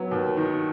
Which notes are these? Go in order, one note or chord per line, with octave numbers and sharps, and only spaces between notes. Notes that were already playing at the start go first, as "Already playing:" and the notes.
Already playing: F#3 B3
D#2
D#3